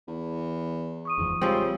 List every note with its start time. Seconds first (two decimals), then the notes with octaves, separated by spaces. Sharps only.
0.07 E2
1.05 C#6 D#6 D#7
1.18 F#1 E2 G#2 F3
1.41 C#3 F3 G3 G#3 C4